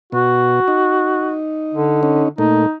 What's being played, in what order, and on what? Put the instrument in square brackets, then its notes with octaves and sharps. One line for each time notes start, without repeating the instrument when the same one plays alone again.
[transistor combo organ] B2 [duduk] F#4
[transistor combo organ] D#4
[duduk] D3
[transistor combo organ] C#4 D#4
[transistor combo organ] A#2 A3 [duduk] D#4